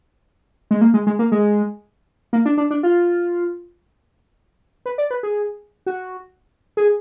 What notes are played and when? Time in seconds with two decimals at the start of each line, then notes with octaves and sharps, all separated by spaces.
0.71 G#3
0.81 A#3
0.94 G#3
1.07 G#3
1.19 A#3
1.32 G#3
2.33 A#3
2.45 D4
2.58 D4
2.71 D4
2.83 F4
4.86 B4
4.98 D5
5.11 B4
5.23 G#4
5.86 F#4
6.77 G#4